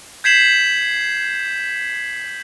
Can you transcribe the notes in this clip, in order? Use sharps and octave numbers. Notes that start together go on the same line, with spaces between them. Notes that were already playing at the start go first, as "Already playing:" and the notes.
G6 G#6 B6 C7 E7 F#7